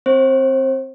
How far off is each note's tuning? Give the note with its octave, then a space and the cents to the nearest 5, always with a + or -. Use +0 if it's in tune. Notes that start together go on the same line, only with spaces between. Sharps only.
C4 +0 C5 +30